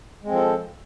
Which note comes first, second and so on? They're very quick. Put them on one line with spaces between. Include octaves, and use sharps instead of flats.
G#3 C4 F3 A4